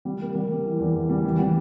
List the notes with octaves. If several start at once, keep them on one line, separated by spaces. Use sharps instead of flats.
G3
A#3
G3
A#3
E3
E2
E2
G3
E3
G3